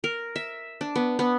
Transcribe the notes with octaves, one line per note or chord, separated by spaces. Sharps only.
A#4
E5
D4
B3
B3